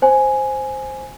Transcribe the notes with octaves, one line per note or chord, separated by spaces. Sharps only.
C5 G#5